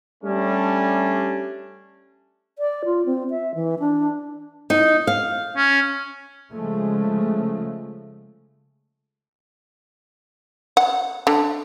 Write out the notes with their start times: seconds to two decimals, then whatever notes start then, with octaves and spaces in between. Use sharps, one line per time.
0.23 G3 A3 C#4 D4
2.58 D5
2.85 F4
3.06 C4
3.30 E5
3.55 E3
3.79 D4
4.70 D#4
5.07 F5
5.57 C#4
6.54 C#3 F3 G#3 A3
10.77 F#5
11.27 D3